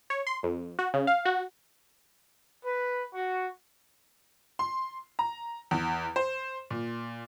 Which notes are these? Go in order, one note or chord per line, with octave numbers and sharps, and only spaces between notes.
C#5
C6
F2
F#4
C#3
F5
F#4
B4
F#4
C6
A#5
E2
C5
A#2